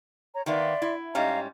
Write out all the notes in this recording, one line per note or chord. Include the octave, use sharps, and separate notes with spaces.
C#5 A#5
D#3 A#3 B3 D5 E5 C6
E4
G#2 G3 C#4 D#5 F5 A#5